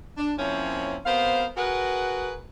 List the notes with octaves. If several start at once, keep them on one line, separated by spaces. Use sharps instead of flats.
D4
F3 A#3 C4 C#4 E4 C#5
C3 B3 A#4 C5 F5
F#4 G#4 A#4 B4 F#5